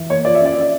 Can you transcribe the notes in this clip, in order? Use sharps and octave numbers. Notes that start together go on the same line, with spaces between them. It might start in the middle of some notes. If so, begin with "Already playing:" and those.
Already playing: E3
A#3 C#5
F3 D5
E5
C#4 D5
C#4 D5